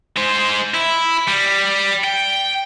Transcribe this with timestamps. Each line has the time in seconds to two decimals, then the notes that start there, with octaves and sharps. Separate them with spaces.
0.17 G#3 C5
0.74 E4
1.28 G3
2.04 G5